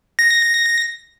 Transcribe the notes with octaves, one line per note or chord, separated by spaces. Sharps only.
A#6